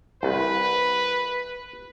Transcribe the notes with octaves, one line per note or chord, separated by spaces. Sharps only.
C2 B4